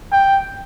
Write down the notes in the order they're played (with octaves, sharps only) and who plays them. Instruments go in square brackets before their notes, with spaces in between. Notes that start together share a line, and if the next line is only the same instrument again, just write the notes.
[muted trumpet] G5